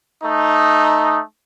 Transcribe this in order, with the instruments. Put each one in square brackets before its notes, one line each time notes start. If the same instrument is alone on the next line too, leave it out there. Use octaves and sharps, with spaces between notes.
[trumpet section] A3 D#4